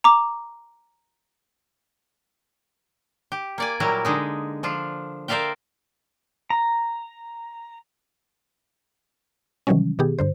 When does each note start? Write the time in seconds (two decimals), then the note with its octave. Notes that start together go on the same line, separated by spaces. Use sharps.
0.04 A#5 D6
3.32 G4
3.58 A#3 D5 G#5
3.80 A#2 F#3 G3 E4 A#4
4.05 D3 G#3 D#4
4.63 F3 D4 F4
5.28 A#4 C5 D5 E5 F5 G5
6.50 A#5
9.67 C3 D#3 E3 F#3 G3 C#4
9.99 B2 D#3 B3 G4 G#4
10.19 G2 D3 C5